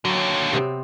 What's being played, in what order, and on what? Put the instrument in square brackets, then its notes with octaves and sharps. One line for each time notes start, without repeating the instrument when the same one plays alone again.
[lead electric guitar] D#2 D3 [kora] F#3
[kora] C3 B3 C4